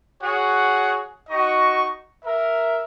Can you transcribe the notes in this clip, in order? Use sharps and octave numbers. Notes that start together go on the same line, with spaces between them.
F#4 G#4 C#5 F#5
D#4 F#4 D#5 C#6
A#4 E5